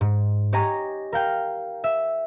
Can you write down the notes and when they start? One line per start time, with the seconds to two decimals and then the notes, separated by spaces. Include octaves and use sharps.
0.01 G#2
0.53 G4 C#5 D#5 G#5 A#5
1.12 A#4 F5 G5
1.84 E5